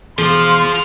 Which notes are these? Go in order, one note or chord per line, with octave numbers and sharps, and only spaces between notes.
E2 B2 E3 F3 F4 G#4 C6